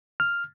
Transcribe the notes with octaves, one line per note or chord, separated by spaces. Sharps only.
F6